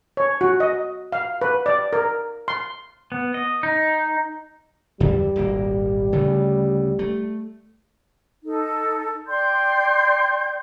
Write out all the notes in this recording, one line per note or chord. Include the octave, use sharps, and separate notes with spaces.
C#5
F#4
D#5
F5
B4
D5
A#4
C6
B3
D#5
D#4
E2 G2 D3 G3
D#1 G#1 A#3
D2 C#3 A3
A3
D#4 A4
D5 G5 C6 G6